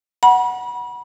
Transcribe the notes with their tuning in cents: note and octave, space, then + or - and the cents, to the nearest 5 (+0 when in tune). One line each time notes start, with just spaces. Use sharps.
F#5 +0 B5 -35